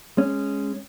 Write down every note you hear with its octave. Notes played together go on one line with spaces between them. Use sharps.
G#3 C#4